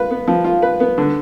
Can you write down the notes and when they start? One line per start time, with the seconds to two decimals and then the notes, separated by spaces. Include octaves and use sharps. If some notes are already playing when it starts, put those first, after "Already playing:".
Already playing: F4 B4
0.11 B3
0.28 F3
0.44 F4
0.62 B4
0.80 B3
0.98 D3